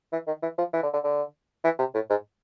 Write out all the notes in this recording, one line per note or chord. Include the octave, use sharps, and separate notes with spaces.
E3
D#3
E3
F3
E3
D3
D3
D3
E3
C3
A2
G#2